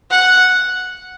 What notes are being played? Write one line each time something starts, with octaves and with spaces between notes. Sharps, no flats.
F#5